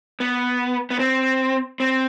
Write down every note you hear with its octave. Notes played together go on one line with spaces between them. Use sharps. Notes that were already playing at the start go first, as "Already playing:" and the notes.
B3
B3
C4
C4